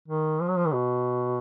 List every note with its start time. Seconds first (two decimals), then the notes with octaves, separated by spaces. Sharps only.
0.08 D#3
0.41 F3
0.49 F#3
0.57 F3
0.66 D#3
0.73 B2